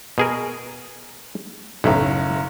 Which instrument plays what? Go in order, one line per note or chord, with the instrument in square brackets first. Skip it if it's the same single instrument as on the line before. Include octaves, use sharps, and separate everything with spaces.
[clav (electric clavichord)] B2 G#4 A#4
[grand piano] F#1 F#2 E5 [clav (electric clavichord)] B1 A2